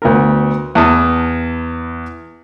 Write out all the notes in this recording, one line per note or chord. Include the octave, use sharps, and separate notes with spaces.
D2 B3 A#4
E2 E4 A5 D#6